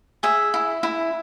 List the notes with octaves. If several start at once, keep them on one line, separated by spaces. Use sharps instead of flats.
G#4 E5
E4
E4